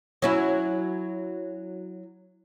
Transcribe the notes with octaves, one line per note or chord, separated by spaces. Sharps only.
F#3 C#4 E4